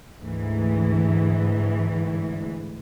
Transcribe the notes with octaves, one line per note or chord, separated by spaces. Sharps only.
D2 G#2 E3